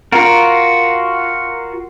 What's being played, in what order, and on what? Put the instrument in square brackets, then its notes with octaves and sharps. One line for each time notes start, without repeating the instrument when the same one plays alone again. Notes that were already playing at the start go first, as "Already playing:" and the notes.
[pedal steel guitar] F4 F#4 A#4